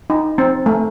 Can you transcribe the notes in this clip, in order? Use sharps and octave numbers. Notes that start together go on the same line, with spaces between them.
D#4
C4
A3